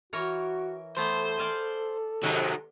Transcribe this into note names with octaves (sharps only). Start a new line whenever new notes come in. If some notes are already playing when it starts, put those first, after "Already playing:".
E3 F#4 A#4 C#5
E3 A3 B3 A4 C5
D5 F5 G#5
G#2 C3 D#3 F#3 D#4